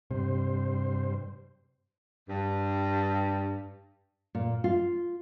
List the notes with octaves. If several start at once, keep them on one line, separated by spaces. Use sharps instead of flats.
G2 C3 C5
G2
A#2
F4